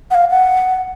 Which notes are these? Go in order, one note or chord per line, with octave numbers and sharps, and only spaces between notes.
F#5
F5
F#5